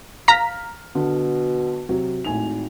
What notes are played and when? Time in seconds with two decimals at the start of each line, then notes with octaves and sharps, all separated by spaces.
0.28 F5 A#5 F6 B6
0.95 B2 D3
1.89 C3 F#3
2.25 G#1 A2 G#5 F7